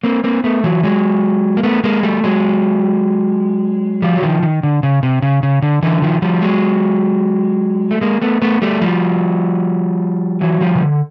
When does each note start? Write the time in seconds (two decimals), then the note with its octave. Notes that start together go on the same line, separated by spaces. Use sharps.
0.04 A#3 C4
0.24 A#3 C4
0.44 A3 B3
0.64 E3 F#3
0.83 F#3 G#3
1.57 A#3
1.63 A3 B3
1.84 G#3 A#3
2.03 G3 A3
2.24 F#3 G#3
4.02 F3 G3
4.17 F#3
4.22 D#3 F3
4.43 D#3
4.63 D3
4.83 C#3
5.03 C3
5.22 C#3
5.43 C#3
5.62 D3
5.83 D3 E3
6.02 D#3 F3
6.22 F3 G3
6.42 F#3 G#3
7.91 A3
8.01 G#3 A#3
8.22 A3 B3
8.42 A3 B3
8.62 G3 A3
8.81 F3 G3
10.41 E3 F#3
10.61 F3 G3
10.75 C#3
10.81 D3